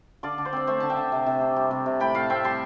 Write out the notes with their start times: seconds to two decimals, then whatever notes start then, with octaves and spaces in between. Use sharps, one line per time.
0.23 D3 D5 F5
0.38 D3
0.45 C5
0.53 C4 D5
0.67 A3 C5 E5
0.80 D3 A5
0.90 E5 G5
0.97 D3
1.12 C3
1.26 C3
1.41 D4
1.56 G3
1.71 C3
1.86 C3
2.00 A2 G5 B5
2.15 A2 F5 A5
2.30 C4 E5 G5
2.44 G3 A5 C6